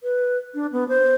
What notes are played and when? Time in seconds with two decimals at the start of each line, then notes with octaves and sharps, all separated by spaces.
0.03 B4
0.54 D4
0.72 B3
0.89 C5